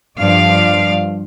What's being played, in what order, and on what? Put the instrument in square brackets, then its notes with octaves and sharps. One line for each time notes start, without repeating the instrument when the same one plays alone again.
[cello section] G2 F3 D5 F5